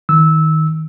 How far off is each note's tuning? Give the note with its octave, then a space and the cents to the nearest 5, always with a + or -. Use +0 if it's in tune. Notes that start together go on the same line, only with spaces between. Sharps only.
D#3 +10 E6 -15